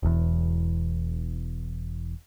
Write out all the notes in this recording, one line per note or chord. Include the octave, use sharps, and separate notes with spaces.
E1 E2